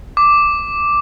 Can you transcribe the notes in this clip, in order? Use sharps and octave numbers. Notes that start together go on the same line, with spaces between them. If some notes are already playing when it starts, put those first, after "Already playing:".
D6